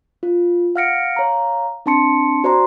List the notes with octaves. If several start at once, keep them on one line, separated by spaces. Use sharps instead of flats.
F4
F5 F#5 F6 A#6 C#7 D7
C#5 F5 A#5
C4 D4 A5 C6 C#7
F#4 C5 D5 A#5 C6